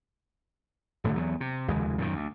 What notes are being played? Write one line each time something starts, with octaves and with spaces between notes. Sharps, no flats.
D#1 A2 D3
E2 F#3
C3
F1 D#2 C#3 G#3
F#2 A#2 D3 D#3
D2